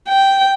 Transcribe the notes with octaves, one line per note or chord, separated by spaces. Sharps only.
G5